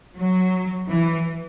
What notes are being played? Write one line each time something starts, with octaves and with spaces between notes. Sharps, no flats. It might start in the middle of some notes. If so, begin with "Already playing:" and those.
F#3
E3